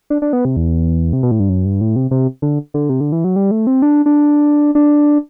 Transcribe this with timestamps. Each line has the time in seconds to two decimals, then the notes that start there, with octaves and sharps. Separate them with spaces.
0.10 D4
0.22 D4
0.33 B3
0.45 C3
0.57 E2
1.13 C3
1.23 B2
1.31 A2
1.40 G2
1.49 F#2
1.65 G2
1.81 A2
1.96 C3
2.11 C3
2.42 D3
2.74 D3
2.89 C3
3.01 D3
3.12 E3
3.24 F#3
3.36 G3
3.51 A3
3.67 C4
3.82 D4
4.06 D4
4.75 D4